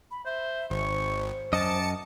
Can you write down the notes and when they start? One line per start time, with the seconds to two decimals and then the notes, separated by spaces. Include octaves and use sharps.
0.11 B5
0.26 C5 E5
0.70 G#1 C5 C#6
1.53 F#2 D#5 A5 D6 C#7